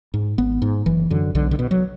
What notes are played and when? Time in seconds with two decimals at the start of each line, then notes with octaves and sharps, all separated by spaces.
0.14 G#2
0.38 G#1 B3
0.62 G#2
0.86 F#1 E3
1.10 F#2 D3
1.35 B1 D3
1.51 D3
1.59 B2
1.71 F#3